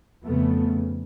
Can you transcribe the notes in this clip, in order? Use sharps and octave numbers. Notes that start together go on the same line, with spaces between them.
F2 C#3 A3 B3